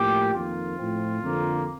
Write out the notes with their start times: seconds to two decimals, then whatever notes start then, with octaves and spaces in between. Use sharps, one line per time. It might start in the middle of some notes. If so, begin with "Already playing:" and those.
Already playing: A2 F3 A#3 G4
0.33 F2 D#3 A#3 F4
0.77 A2 F3 C4
1.23 F2 D3 F3 A#3